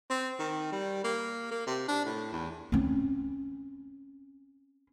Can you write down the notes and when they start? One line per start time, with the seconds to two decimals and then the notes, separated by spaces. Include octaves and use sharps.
0.10 C4
0.39 D#3
0.72 G3
1.04 A#3
1.51 A#3
1.67 C3
1.88 D4
2.05 A2
2.32 E2
2.72 C4 C#4